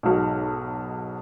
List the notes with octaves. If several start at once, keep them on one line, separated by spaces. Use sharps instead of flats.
B1 G#2 B2